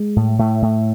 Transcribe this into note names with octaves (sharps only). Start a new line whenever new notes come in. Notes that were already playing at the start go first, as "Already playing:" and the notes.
Already playing: G#3
A2
A2 A3
A2